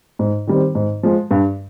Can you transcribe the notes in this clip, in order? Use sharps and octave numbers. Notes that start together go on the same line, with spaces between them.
G#2
D#3 G3 C4
G#2
F3 G#3
G2